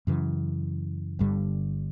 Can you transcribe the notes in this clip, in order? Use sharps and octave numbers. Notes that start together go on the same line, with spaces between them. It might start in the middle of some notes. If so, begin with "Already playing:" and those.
F#2 C#3 E3
G1 G2 D3 G3